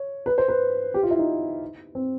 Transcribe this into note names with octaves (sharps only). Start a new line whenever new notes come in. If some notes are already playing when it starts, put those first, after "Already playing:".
Already playing: C#5
B4
C5
B4
G4
F4
E4
D#4
C4